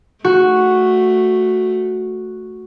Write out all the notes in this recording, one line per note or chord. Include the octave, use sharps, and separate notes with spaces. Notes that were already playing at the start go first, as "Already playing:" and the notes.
A3 F#4